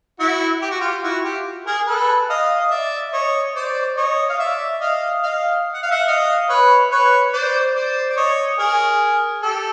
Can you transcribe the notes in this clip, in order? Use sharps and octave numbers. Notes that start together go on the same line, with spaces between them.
E4 F#4
G4
F#4
F4 G4
E4 F#4
F4 G4
G#4 A#4
A4 B4
D#5 F5
D#5
D5 E5
C#5 D#5
C5 D5
C#5 D#5
F5
D5 E5
D#5 F5
D#5 F5
F#5
F5
E5 F#5
D#5 F5
B4 C#5
B4 C#5
C5 D5
C5 D5
D5
C#5 D#5
G#4 A#4
G4 A4